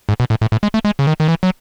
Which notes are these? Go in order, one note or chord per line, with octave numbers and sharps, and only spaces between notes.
G#2
B2
A2
A2
A2
G#3
A3
G#3
C#3
D#3
D#3
E3
F#3